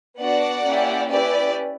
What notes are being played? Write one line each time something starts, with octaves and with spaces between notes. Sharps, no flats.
B3 D4 F#4 D5 F#5
A#3 C#4 E4 G4
C#4 E4 G4 B4 D5